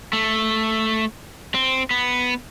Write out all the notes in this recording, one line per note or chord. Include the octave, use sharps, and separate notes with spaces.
A3
C4
B3